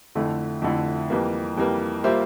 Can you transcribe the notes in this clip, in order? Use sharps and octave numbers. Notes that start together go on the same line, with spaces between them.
F2 D3 A3 E4
F2 D3 A3 E4
F2 E3 G3 A#3
F2 E3 G3 A#3
G3 A#3 F4 C5 E5